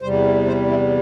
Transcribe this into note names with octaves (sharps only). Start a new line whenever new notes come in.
E2 C3 G3 C5
C5
E4